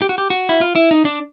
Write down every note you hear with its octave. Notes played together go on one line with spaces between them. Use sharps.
G4
F#4
G4
F#4
E4
F4
E4
D#4
D4